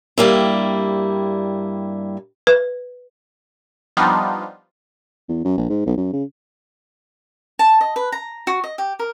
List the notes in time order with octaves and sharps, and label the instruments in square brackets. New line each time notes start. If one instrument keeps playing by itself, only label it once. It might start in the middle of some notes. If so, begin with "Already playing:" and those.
[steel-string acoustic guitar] G2 G3 A#3 E4
[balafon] B4
[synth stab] F3 G3 B3 D4 D#4 F4
[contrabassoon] E2
F#2
A#1
G#2
B1
F#2
C#3
[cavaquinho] A5
D#5
B4
A#5
F#4
D#5
G4
A#4